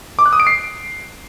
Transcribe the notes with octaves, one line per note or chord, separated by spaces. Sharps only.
D6
F#6
D#6
D7
C7